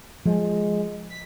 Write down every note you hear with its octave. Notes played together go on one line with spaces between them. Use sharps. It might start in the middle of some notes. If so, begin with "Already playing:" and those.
F3 G#3
B6